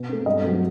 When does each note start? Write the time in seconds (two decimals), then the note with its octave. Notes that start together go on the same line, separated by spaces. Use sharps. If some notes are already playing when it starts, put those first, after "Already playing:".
Already playing: B2
0.09 A3 C4
0.26 G2 D#5
0.44 F#3 A3 C4